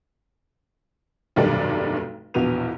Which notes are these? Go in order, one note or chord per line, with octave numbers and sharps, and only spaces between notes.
F1 B1 G2 D#3 A4 D5
A#1 E2 B2 B3 D#7 F7